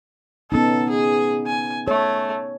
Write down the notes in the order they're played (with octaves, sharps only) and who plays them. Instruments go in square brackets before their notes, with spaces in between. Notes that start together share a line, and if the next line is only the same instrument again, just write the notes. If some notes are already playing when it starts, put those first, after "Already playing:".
[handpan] B3 C#4 D#4 [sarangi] A4
[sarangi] G#4
G#5
[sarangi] A3 [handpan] C#5